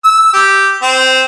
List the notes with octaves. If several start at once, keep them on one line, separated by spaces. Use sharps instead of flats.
E6
G4
C4